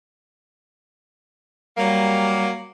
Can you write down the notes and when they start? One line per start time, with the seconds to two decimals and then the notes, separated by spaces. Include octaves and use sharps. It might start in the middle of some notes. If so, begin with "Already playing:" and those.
1.77 F#3 G3 A#3